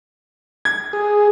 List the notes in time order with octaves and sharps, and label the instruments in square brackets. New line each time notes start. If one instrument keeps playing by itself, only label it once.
[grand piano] G#6
[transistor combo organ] G#4